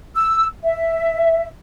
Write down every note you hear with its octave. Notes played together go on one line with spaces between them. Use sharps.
E6
E5